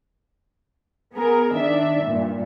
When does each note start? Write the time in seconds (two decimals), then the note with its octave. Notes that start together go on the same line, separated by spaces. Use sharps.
1.13 B3 G#4 A#4
1.55 D#3 D4 E5
2.05 G2 A#2